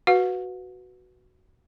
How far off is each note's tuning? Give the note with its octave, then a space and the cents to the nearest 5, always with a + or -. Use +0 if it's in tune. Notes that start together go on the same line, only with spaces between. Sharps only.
F#4 +0 B4 +0 F#5 -45